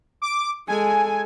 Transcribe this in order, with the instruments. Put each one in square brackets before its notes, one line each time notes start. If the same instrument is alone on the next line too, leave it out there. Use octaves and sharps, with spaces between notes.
[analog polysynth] D6
[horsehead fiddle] G#3 A4 [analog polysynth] G#5